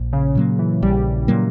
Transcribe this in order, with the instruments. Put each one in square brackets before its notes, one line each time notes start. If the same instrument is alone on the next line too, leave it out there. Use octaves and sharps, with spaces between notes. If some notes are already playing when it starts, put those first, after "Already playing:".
Already playing: [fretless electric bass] A#1
[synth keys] C#3
[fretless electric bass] A#2 F#3 A#3
[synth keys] E3
[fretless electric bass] A#1 [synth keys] G3
[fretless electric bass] A#2 F#3 A#3